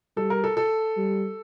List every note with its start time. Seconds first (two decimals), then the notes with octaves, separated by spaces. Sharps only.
0.16 G3 A4
0.30 A#4
0.44 A4
0.57 A4
0.97 G3